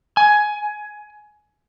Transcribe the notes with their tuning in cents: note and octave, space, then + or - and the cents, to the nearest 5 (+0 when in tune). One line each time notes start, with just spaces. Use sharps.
G#5 +15